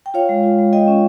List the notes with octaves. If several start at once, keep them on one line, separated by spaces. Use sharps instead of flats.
G5
F4 C#5 F5
G#3
F4
G#3
F4 D#5 G5
C#4